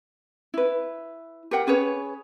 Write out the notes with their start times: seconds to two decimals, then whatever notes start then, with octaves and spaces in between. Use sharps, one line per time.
0.54 E4 B4
1.51 G4 A#4 F#5 G5
1.67 C#4 G#4 B4 C#5